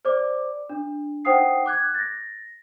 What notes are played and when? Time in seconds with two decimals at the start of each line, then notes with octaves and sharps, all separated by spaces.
0.05 C5 D5 D6
0.70 D4
1.25 D#4 C5 F#5 G5 D#6 C7
1.66 D6 F#6 G#6
1.94 A6 A#6